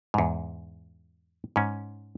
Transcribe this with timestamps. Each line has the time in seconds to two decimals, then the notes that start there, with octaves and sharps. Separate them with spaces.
0.14 E2 G#2
1.56 G#2 C#4